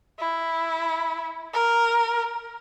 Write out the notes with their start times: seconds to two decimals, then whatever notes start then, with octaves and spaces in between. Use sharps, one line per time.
0.19 E4
1.54 A#4